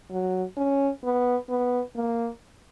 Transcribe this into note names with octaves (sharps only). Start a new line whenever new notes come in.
F#3
C#4
B3
B3
A#3